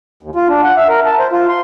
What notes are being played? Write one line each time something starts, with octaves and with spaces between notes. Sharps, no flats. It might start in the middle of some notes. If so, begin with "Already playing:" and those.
D#2
F4
D4
F#5
E5
A#4
A5
C5
F4
C6